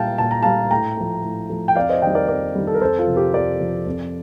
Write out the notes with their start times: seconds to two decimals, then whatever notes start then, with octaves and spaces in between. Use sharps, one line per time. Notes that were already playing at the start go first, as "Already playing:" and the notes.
Already playing: A#2 G3 F5 G5 A5
0.18 A#2 A5
0.31 A#5
0.43 G3 F5 A5
0.71 A2 G5 A#5
0.97 F3 A3
1.23 A2
1.49 F3 A3
1.68 G5
1.76 F2 D5 F5
1.89 C5 D#5
2.02 D#3 G3 D#5 G5
2.15 A#4 D5
2.28 F2 A#4 D5
2.55 D#3 G3
2.67 A4
2.74 A#4
2.81 F2 A4 C5
2.99 F4 A4
3.07 C3 F3
3.15 G4 A#4
3.33 F2 A#4 D5
3.59 C3 F3
3.86 F2